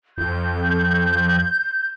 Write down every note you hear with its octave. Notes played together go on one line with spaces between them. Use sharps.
F2 G6